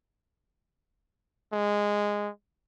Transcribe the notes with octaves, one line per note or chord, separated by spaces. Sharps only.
G#3